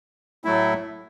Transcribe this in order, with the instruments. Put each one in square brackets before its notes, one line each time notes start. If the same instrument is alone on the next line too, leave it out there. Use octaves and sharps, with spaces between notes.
[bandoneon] A2 F#3 A3 E4